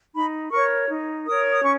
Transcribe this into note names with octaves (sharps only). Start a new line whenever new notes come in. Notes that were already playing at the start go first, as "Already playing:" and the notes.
D#4 B5
A#4 C#5 C#6
D#4
A#4 C#5 D#6
D#6
C#4 C#6